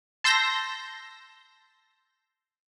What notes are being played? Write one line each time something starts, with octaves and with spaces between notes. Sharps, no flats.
A5 C6 E6 G6 A#6